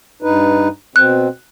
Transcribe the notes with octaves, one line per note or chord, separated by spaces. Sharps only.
G2 D#4 B4
B2 C4 F#6